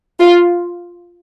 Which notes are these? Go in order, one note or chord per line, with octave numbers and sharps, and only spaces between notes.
F4